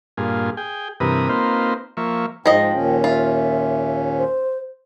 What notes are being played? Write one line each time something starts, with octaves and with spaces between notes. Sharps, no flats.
G2 A#2 F4 G#4
G#4 G5
G2 C3 E3 A#4 B4 D#6
A#3 C4 D#4 F4 B4 C5
F3 A#3 E5 C#6
G#2 F3 D#5 G5
D#2 A#2 C#4
F4 E5
C5